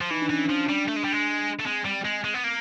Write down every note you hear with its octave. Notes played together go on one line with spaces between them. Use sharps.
F3
E3 D#4
D4
E3 C#4
F3 D4
G3
A3
G#3
G3
G#3
A3
G#3 C4
G3
G#3
G#3
B3
A#3